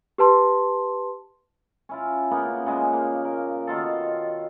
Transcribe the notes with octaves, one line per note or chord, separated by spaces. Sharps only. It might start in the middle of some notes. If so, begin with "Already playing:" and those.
G4 B4 A5 C6
C#4 E4 F4
C#3 A#3 B3 C#4
A#2 C#3 G#3
A#3
A#4
B2 D#3 F4 A4